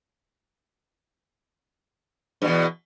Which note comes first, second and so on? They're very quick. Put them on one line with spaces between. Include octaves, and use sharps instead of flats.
G2 B2 E2